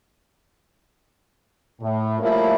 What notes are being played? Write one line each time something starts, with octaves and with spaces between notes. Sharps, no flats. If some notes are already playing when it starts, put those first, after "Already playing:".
A2
F3 G3 A3 A#3 C#4 E4